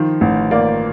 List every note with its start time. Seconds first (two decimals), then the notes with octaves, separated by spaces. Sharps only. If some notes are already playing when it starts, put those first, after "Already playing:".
Already playing: D#3 F3 C5
0.21 A1
0.51 A#3 D5